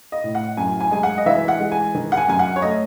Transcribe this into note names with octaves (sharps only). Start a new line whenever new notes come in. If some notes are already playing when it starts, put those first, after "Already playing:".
D#5
A2
F#5
F#2 G#5
G#5
G#3 G#5
F#5
D#5
E3 E5
F#5
G#3
G#5
D#3
F#5
G#5
F#2 G#5
F#5
C#5
A3 D#5